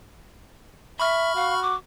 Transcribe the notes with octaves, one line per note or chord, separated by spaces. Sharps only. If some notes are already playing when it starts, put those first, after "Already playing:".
E5 B5 C#6 F6
F#4 F5
D6